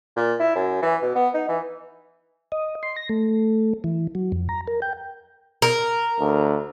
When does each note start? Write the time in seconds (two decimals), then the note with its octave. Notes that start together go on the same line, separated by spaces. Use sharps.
0.17 A#2
0.40 E4
0.56 F#2
0.82 E3
1.03 B2
1.16 B3
1.34 D#4
1.49 E3
2.52 D#5
2.83 C6
2.97 A#6
3.09 A3
3.84 E3
4.15 F#3
4.32 F2
4.49 A#5
4.67 A#4
4.82 G5
5.62 A#4
6.20 D2